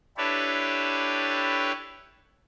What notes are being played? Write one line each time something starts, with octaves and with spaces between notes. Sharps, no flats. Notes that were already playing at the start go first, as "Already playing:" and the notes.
D4 E4 G4 A4 B4 C#5